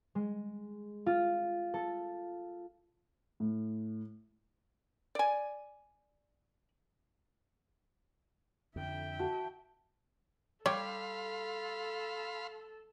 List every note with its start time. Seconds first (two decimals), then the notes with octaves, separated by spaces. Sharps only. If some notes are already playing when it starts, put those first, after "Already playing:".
0.15 G#3
1.06 F4
1.74 A4
3.40 A2
5.15 D5 G#5
8.76 F2 D3 E5 G5
9.19 F#4 A5
10.66 G3 A4 C#5 F5 B5 C6